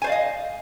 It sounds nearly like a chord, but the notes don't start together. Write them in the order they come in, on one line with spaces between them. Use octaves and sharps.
G#5 C5 D5 F5 D#5